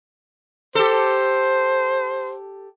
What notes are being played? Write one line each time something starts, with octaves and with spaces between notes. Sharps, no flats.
G4 A4 C5